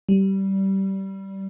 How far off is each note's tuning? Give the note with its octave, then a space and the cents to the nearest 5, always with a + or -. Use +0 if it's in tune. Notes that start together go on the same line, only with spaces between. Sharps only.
G3 -20